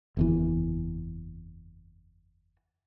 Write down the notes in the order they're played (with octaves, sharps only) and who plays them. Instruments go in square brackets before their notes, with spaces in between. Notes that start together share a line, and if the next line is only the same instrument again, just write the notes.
[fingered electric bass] F#1 E2 E3